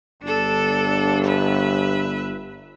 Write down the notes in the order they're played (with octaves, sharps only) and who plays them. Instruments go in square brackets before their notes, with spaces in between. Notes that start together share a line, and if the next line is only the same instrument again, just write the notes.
[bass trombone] G1 [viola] D4 A4
[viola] B4 E5